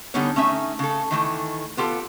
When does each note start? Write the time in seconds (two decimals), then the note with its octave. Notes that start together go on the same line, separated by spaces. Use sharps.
0.14 D3 G3 B3 C#4 D#4 C#5
0.36 A3 C#4 D#4 E5
0.79 C#3 A4
1.11 D#3 E3 A3
1.77 B3 F4 G4 A4